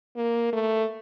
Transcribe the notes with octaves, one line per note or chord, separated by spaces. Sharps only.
A#3
A3